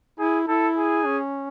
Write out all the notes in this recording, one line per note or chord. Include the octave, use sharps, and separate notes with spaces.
E4 G#4
E4 A4
G#4
C#4